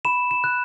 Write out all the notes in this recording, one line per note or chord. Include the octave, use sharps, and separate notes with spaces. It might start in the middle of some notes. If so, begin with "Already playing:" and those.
B5 E7
E7
F#6